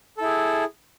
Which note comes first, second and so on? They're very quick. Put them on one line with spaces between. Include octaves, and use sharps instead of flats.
A4 E4 G#4